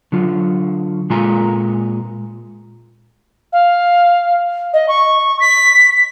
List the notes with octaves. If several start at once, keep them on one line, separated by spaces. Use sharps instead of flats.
D3 F#3 F4
A#2 G#3 F4 G#5 A#5
F5
D#5
C#6
B6